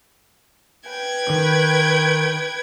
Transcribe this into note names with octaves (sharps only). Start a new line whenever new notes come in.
B4 G5 G#6
D#3